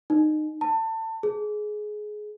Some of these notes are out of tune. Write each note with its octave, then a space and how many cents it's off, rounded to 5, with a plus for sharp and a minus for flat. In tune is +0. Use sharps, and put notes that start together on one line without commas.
D#4 -25
A5 +25
G#4 +20